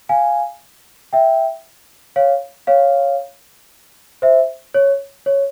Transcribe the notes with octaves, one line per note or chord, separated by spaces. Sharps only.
F5 G#5
E5 G5
C#5 F5
C#5 F5
C5 E5
C#5
C#5